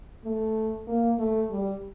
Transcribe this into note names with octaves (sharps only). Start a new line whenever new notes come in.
A3
A#3
A3
G3